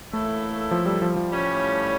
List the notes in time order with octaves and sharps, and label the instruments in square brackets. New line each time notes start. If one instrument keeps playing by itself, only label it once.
[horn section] A2 E3 A#3 E4 A4 [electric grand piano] A3
[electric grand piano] F3
G3
F3
F3
[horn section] A2 G3 C#4